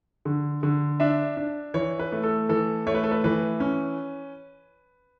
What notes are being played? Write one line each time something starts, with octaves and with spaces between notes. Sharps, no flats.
D3
D3
D4 E5
D4
E3 C#5
B4
A3
A4
E3 A4
A3 C#5
B4
A4
B4
E3 B4
C#4